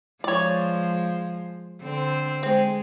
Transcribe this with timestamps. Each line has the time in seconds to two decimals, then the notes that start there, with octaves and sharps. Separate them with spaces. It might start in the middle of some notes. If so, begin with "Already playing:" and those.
0.24 F3 G#3 C#5 D5
1.81 D3 C4
2.43 G#3 C4